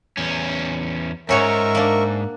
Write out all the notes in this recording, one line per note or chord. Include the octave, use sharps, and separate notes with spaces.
E2 C#4
F2 G#2 C#4 F#4 A#4 C#5 E5 C#6
A#3 D4